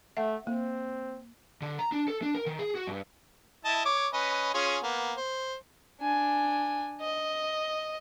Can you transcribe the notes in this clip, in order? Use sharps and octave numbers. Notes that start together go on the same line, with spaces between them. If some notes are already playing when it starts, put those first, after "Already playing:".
A3 E5 F#5
A#3 C4
D3
A#5
D4
A4
D4
A#4
D#3
G#4
F#4
G2
E4 D#5 A5
C#5 D6
C#4 B4 D#5
C#4 F4 G#4
A#3 B3
C5
D4 G#5
D#5